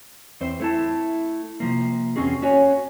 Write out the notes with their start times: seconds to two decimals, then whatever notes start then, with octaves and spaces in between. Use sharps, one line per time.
0.41 E2 C4 C5
0.60 A3 E4 A5
1.60 C3 F3 A#3
2.16 E2 C3 C4 C#4 F#4 G#4
2.42 C#4 F#4 C#5 G#5